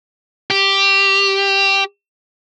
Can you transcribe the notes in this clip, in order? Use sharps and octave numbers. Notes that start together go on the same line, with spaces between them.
G4